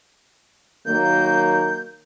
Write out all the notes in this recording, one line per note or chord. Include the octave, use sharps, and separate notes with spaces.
D#3 F#3 A#3 G6